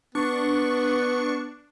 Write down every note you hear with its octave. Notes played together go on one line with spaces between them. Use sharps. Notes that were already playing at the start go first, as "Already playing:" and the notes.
B3 D4 C#6